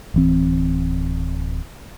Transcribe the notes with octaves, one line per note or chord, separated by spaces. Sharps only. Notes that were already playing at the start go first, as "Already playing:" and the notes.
D1 E3 C4